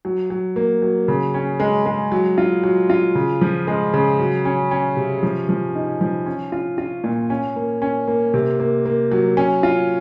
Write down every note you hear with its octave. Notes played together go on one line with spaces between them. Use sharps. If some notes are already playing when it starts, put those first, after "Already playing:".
F#3
F#3
A#3
F#3
C#3
C#4
G#3
G#3
F#3
F4
F#3
F4
C#3
F3
G#3
C#3
F#3
C#4
C#4
C3
F3
F3
D#4
F3
C#4
F4
F4
A#2
C#4
A#3
C#4
A#3
C3
A#3
A#3
F#3
C#4
F4